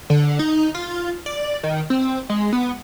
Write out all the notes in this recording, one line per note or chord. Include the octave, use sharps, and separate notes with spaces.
D3
D#4
F4
D5
D#3
C4
G#3
B3